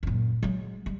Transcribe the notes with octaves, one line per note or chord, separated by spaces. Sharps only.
F#2 A#2
F#3 G#3
G3